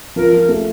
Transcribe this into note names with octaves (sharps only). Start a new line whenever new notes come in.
F3 A#4
F3
A3